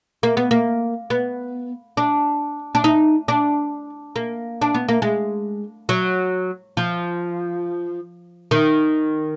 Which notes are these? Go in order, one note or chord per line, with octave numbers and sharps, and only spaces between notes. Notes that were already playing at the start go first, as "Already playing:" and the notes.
A#3
B3
A#3
B3
D4
D4
D#4
D4
A#3
D4
B3
A#3
G#3
F#3
F3
D#3